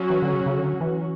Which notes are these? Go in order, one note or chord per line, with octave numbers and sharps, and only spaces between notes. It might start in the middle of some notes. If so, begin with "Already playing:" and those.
Already playing: F#3 C#4 F#4
E3
D3
C#3
C#3
D3
E3